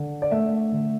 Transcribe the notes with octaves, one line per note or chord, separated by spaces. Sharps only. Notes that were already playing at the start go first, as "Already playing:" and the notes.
Already playing: D3
D5
A3 E5
D3